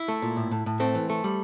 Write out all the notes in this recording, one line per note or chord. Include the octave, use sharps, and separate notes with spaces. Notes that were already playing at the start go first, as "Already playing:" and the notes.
Already playing: E4
A3
A#2
A2
A2
A2
A3 C4
E3
A3
G3